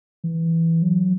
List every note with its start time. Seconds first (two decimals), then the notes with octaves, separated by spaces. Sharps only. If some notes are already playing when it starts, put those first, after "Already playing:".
0.24 E3
0.82 F#3